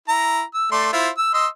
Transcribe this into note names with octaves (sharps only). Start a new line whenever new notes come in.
E4 A#5
E6
A3 D5 C6
E4 F4 C5
E6
D#5 C6 E6